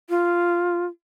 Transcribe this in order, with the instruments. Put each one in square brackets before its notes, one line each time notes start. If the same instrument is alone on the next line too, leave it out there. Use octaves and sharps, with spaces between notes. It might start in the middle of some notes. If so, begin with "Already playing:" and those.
[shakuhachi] F4